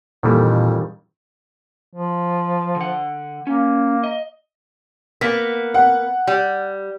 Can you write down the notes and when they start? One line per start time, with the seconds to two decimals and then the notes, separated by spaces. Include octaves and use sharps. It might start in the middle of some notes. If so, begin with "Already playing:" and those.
0.23 F2 A#2 D#3 E3 G3
1.93 F3
2.76 D3 F#5
3.47 A#3 C#4
4.04 D#5
5.21 A#3 B3 B6
5.74 F#5
6.27 G3